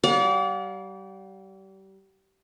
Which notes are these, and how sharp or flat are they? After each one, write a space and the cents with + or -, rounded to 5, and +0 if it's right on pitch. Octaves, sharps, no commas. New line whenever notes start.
G3 -30 D5 -35 F5 +45